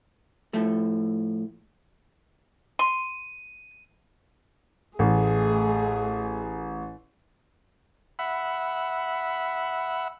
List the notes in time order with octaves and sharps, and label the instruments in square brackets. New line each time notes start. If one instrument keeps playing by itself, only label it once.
[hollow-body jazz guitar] A2 F3 A3
[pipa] C6 [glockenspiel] D#7
[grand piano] A1 [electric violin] A3 G#4
[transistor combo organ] E5 F#5 B5